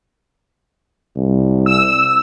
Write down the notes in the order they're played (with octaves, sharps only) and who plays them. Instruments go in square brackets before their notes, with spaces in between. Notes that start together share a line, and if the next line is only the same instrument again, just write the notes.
[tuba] C2
[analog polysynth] E6